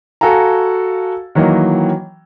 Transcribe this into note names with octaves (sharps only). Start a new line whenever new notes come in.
F#4 A4 F5 G#5 A#5
D#3 E3 F#3 A#3 D#5